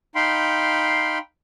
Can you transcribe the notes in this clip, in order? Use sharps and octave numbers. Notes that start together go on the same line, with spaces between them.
D#4 F5 G5 B5 C6